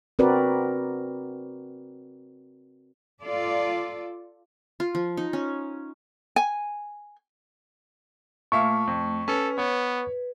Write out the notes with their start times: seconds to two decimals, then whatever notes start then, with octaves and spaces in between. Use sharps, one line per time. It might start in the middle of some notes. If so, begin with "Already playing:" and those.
0.19 C4 F#4 A#4 B4 D5
3.22 F4 A4 D5
4.80 F4
4.95 F3
5.17 D#4
5.33 C#4
6.36 G#5
8.52 A#2 A3 E5 F5 C#6
8.87 F2
9.28 C#4 A4 B4
9.58 B3 C#5